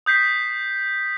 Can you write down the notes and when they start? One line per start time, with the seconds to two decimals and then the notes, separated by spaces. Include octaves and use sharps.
0.06 D#6 G6 B6 C7